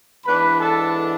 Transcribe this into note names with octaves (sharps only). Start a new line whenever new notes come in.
G#2 E3 B3 D4 B4 B5
A4 A5